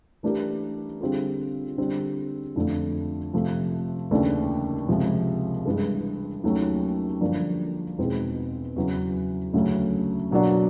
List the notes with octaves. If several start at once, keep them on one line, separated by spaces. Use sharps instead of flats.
E3 A3 D4 G4 A#4
D3 G3 C4 F4 G#4
D3 G3 C4
F2 D3 F3 A3
C3 F3 A3
D#2 C#3 E3 A3 D4
C#2 C3 F3
G2 E3 G#3
D#2 D#3 F#3 A3 C#4
G2 D3 F3 A#3 D4
E2 B2 G#3 C4 D#4
E2 C#3 F#3
D2 C#3 F#3 A3 C#4
B2 F#3 A#3 D4 F#4